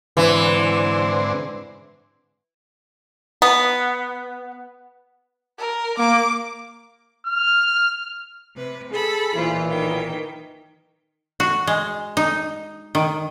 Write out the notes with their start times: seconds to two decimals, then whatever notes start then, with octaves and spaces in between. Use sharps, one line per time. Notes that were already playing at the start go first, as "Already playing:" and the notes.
0.17 G#2 D3 E3 C4
3.42 B3
5.59 A#4
5.98 A#3 D6
7.27 F6
8.55 C3 B4
8.92 G#4 A4 A5 B5
9.34 B1 A#2 E3 F4 C5
9.67 D#3 G5
11.40 F#4
11.67 G#3
12.17 D#4
12.95 D#3